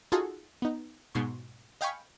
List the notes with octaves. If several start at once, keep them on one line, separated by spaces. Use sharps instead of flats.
D#4 F4 F#4 G#4 A4
B3 D#4
G#2 B2 C6 C#6
D#5 F5 G5 G#5 B5 C#6